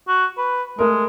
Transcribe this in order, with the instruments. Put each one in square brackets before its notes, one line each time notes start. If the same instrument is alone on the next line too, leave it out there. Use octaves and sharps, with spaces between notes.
[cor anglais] F#4
B4
[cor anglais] G#3 [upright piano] A3 A#4